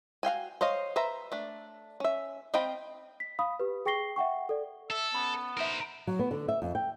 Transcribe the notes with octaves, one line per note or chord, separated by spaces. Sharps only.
F#4 F5 G5 G#5
C5 C#5 D#5 F5
B4 C5 E5 A#5
A3 D4
C#4 E5
C4 D#5 F5 G5 B5
B6
F5 B5 D#6
G4 B4
G#4 G5 C#6 A#6 C7 G7
E5 F#5 G5 C#6
A4 D5
A4 E5
B3 C#4 B5
D#4 A#4 C5 E5
F#3
B3
D3
E5
F2
G5